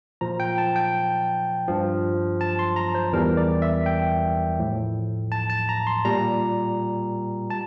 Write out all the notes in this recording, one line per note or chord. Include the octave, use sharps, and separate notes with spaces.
A#2 F3 A#5
G5
A5
G5
G2 F3
A5
C6
A#5
C5
E2 E3 G3 A#4
D5
E5
G5
A2 F3
A5
A5
A#5
C6
A#2 G3 A#5
A5